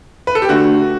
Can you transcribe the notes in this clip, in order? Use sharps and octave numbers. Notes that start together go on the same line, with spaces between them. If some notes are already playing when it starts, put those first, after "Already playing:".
B4
A4
G4
D3 A3 F#4